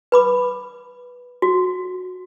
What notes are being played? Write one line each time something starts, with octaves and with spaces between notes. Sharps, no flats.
B4 B5 D6
F#4